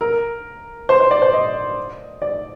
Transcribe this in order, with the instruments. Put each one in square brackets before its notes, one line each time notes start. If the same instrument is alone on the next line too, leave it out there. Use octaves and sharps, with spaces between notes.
[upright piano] A#4
C5
C5
D5
C5
D#5
D5